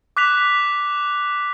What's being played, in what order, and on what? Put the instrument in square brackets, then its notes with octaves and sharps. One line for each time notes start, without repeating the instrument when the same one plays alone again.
[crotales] D6 F#6 B6 F7